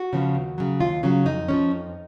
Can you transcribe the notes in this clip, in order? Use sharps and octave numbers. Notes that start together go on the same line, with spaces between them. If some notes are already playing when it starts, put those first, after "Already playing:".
Already playing: F#4
C#3 F3 B3
D#2
C#3 F#3
D#2 F4
C#3 F#3 C#4
F2 D#4
F3 G#3 C#4
F2